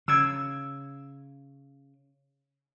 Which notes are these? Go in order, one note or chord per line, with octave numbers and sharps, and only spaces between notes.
C#3 E6 G#6